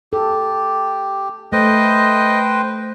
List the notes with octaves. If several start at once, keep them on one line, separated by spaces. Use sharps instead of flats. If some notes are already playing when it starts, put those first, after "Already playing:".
G4 A4
A3 B4 C5 D#5 G5